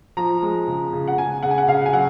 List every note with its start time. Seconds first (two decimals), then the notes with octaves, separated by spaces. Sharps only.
0.17 F3 A#5
0.43 G#3
0.68 C#3
0.93 C#3
1.07 F#5
1.18 C#3 G#5
1.43 C#3 F#5
1.51 G#5
1.58 F#5
1.68 C#3 F5
1.86 G#5
1.93 F#3 F#5